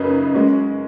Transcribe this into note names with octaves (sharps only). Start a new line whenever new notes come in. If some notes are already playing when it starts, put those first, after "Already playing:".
Already playing: F#2 C#3 D#4 B4
G#3 C#4 F#4